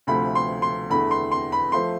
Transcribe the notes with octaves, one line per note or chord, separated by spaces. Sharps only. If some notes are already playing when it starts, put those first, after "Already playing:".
D2 C3 F3 A3 B5
C6
C6
E2 D3 A3 B5
C6
C6
B5
F3 A3 C6